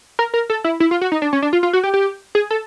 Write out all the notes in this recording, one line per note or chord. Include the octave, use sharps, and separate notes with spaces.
A#4
A#4
A4
E4
E4
F4
F#4
D#4
D4
C#4
D4
F4
F4
F#4
G4
G4
G#4
A4